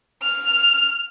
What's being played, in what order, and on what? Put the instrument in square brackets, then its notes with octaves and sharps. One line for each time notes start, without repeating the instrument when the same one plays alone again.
[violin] F6